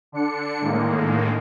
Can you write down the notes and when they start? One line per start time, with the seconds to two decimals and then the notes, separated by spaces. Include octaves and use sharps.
0.12 D3 D4 C#7
0.61 A2 D3 D#3 G#3 A#3